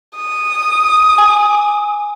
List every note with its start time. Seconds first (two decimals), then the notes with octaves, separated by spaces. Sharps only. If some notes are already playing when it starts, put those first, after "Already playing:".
0.16 D#6
1.18 G#5